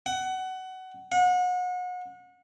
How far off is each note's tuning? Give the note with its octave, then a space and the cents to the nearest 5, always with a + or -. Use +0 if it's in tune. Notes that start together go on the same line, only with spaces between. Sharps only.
F#5 +20
F#5 -35